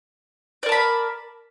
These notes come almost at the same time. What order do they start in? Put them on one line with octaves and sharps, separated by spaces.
D5 A#4 A5 B5